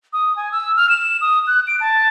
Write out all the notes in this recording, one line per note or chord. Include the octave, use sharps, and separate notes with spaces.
D#6
G#5
E6
F6
E7
D#6
F#6
D7
A5